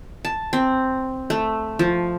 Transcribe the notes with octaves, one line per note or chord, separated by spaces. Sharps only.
A5
C4
A3
F3